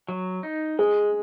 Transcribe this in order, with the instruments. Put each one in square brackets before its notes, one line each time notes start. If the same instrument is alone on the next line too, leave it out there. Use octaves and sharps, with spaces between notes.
[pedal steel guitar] F#3
D#4
[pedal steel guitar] G#3 [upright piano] G#4